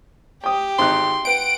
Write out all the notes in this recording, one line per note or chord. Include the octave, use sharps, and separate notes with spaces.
G4 G5 D#6
G#1 D#4 C6 F#6
B4 F#5 G5 D7